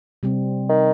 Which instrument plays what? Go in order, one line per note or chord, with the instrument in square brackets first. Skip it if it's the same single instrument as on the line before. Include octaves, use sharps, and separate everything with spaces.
[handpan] C3 G3 C4
[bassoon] D#3